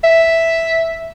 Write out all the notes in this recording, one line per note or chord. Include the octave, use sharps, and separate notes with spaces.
E5